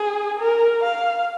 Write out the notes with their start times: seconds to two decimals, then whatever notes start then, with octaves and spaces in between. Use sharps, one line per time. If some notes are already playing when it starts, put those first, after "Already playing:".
Already playing: G#4
0.40 A#4
0.84 F5